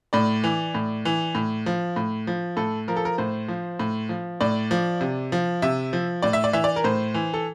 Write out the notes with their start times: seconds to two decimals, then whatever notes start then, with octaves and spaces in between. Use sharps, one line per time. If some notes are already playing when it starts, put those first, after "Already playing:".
0.13 A2 D5
0.44 E3
0.75 A2
1.05 E3
1.35 A2
1.66 F3
1.96 A2
2.27 F3
2.57 A2 A4
2.88 F3 A#4
2.96 A4
3.05 A#4
3.18 A2 C5
3.48 F3
3.80 A2
4.09 F3
4.40 A2 D5
4.71 F3
5.01 C3
5.32 F3
5.62 C3 E5
5.93 F3
6.22 A2 D5
6.33 E5
6.44 D5
6.53 E3 E5
6.64 D5
6.76 A#4
6.84 A2 C5
7.14 E3
7.34 A4